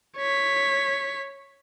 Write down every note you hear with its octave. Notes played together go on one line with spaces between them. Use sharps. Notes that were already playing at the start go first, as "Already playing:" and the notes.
C#5 B6